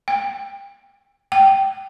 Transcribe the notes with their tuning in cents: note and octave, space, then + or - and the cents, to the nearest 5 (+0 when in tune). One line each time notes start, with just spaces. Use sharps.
G5 +15
G5 -15